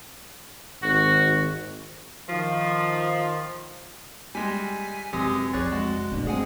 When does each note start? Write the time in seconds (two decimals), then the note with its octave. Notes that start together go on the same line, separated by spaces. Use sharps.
0.83 G#1 F#4
2.28 D#3 F3
4.35 G3 G#3 G#5 B6
5.13 F#2 C3 E3 G#3 G4 G#5 D#6
5.53 B1 F2 G#4 C#5 D5 F#6 A6
5.72 G#3 F#4
6.11 G2 B2 A3 D4
6.27 G#3 C4 G#4 F#5 G#5